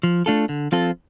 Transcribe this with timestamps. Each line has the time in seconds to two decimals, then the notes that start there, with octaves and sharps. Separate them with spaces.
0.03 F3
0.26 A3 D4 F4 A4
0.49 D3
0.72 F3 C4 F4 A4